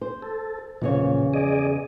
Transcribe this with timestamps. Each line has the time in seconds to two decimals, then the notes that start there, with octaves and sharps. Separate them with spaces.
0.01 C5
0.22 A4
0.82 E2 A#2 C#3 F3 C#5
1.34 G#4 D5 D#5